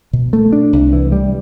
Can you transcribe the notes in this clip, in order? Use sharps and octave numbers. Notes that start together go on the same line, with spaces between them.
B2
A3
D4
C2
E3
G3